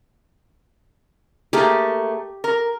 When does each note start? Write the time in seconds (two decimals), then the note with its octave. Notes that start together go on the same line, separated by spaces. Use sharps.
1.53 A3 A#3 G4 G#4
2.44 A#4